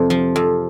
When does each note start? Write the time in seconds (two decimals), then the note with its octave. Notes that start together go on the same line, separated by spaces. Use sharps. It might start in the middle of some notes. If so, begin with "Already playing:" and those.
Already playing: F2 C3 C4
0.10 F3
0.36 F2